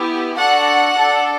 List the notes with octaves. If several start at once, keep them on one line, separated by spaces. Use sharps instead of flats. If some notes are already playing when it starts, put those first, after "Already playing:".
Already playing: B3 E4 G4
D4 F#4 A4 F#5
D4 A4